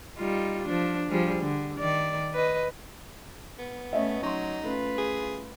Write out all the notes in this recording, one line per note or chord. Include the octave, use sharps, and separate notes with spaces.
G3 D#4 F4
F3 D4
F3 G3 G#4
D3
D#3 D5
B4 D#5
B3
A3 C#4 C#5 D#5 E5
F#3 D#4 C6 C#6
A3 C#4 F4 B4
G#4